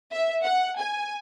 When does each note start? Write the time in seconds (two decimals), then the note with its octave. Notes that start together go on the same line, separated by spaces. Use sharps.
0.12 E5
0.43 F#5
0.79 G#5